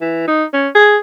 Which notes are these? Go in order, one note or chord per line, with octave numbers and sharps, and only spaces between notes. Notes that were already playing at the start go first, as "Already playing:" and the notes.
E3
D#4
C#4
G#4